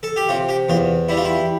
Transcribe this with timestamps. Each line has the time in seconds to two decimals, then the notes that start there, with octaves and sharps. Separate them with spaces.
0.03 A4
0.16 G4
0.29 C3 F4
0.49 G4
0.69 E2 F4
1.09 G3 E4
1.17 F4
1.25 E4